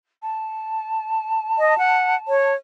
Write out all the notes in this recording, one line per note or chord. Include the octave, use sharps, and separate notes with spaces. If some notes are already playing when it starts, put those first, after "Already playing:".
A5
D#5
F#5
C#5